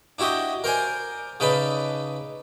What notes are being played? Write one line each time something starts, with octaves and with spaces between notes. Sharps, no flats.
D4 E4 F#4 G4 D#5
A#4 C5 D5 G#5
C#3 D#4 B4 D5 A5 B5